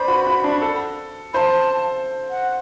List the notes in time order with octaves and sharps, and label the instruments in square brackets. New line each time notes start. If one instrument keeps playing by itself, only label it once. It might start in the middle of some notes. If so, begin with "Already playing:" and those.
Already playing: [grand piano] B4 C5 D5 [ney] B5
[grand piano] F#4
F#4
D4
A4
[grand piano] C5 [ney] A5 B5
[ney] F#5